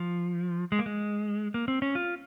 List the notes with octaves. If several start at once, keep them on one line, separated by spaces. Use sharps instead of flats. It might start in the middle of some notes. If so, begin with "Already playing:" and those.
Already playing: F3
G#3
A#3
G#3
A#3
C4
C#4
F4